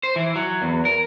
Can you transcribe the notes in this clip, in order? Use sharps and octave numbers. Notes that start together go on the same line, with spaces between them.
C5
E3
F#3
E2
A#4